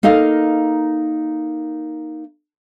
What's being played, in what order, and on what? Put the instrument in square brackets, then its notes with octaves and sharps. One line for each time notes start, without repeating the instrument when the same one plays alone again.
[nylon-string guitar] A#3 D#4 A4 D#5 F5